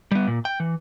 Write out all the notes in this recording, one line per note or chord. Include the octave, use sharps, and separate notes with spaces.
G3 B3
A#2
G5
E3